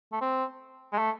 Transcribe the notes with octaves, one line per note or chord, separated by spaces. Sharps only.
A3
C4
G#3
A3